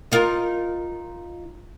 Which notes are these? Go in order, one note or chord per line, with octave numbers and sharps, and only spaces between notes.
D#4 F4 A#4